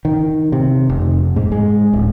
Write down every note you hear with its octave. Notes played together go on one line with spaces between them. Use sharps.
D#3
C3
F1
G#2
G#3
D1